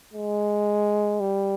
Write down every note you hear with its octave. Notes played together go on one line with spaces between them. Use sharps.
G#3
G3